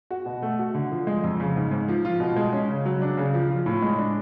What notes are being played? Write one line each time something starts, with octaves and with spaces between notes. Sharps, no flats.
F#4
B2
A3
F#4
D3
F3
G#3
F2
C#3
G#2
G#2
F3
F4
B2
G#3
C#4
C#3
F#3
D4
C#3
F3
F4
A2
G#3
D4